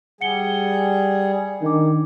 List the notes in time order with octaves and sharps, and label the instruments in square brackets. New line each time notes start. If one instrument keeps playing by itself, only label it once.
[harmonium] G3 G#4 [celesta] F#5 C#7 G7
[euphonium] D#3 [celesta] D4 D6